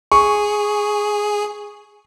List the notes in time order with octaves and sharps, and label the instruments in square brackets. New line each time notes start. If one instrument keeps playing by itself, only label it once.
[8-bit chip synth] G#4 [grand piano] C#6